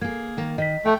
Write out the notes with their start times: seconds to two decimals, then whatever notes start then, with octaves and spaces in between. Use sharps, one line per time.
0.01 A#3 G#4 G#6
0.37 D#3 A#3
0.58 D#3 D#5 B6
0.86 A3 G5